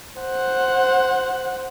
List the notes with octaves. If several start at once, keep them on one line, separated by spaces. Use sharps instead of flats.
C5 F#5